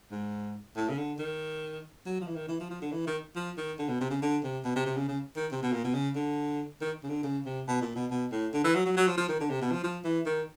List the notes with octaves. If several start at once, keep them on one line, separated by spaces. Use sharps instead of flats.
G#2
A2
C#3
D3
D#3
F#3
F3
E3
D#3
E3
F3
F3
D3
E3
D#3
F3
D#3
D3
B2
C3
C#3
D3
C3
B2
C3
C3
C#3
C#3
D#3
C3
B2
A#2
B2
C#3
D3
D#3
C#3
D3
C#3
C3
B2
A#2
B2
B2
A2
D3
E3
F#3
F#3
F#3
F3
F3
D#3
D3
C3
B2
F3
F3
E3
D#3